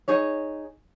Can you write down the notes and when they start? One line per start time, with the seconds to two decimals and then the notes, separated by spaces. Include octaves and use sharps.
0.08 D#4 G#4 C#5